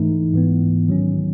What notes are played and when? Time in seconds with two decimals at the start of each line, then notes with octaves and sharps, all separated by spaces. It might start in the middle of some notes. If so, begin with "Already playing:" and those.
Already playing: G#2 E3 A3 D#4
0.34 G#2 E3 B3
0.89 D#3 F#3 C#4